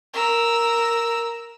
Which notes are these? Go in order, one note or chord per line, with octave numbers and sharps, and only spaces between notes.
A#4 E6